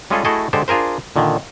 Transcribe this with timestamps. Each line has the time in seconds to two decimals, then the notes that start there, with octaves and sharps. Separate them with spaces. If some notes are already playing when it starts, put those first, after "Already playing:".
0.10 G3 G#3 C#4 F4 G#4 A4
0.25 A3 E4 F#4 G#4 A4 D#5
0.53 D3 G#3 G4 A4 C5
0.68 D4 F4 G#4 A#4 C5
1.16 A#2 D3 D#3